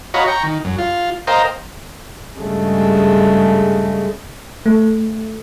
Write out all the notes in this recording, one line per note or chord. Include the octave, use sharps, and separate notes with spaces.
F#4 C#5 D#5 F5 A#5 B5
G5 A#5 C#6
D#3
F#2
F4
A#4 C5 D#5 F5 G5 A#5
G2 C#3 G#3 A3
A3